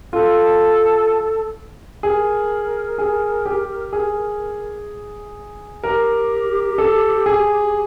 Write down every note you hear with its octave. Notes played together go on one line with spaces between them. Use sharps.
F4 A4
G#4 A#4
G#4
G4
G#4
G4 A#4
A4
G#4